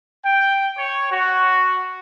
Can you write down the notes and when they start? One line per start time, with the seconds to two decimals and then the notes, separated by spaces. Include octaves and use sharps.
0.26 G5
0.78 C#5
1.12 F#4